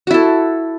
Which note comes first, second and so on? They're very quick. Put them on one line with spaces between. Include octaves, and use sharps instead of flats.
F#4 E4 A4